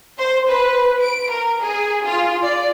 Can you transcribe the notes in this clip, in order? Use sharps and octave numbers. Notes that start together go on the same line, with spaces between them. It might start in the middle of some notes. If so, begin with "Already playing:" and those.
C5
B4
D7
A#4
G#4
F4
D5